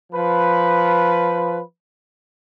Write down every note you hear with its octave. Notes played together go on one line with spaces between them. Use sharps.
F3 B4